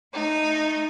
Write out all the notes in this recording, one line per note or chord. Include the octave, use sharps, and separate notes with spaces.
A3 D#4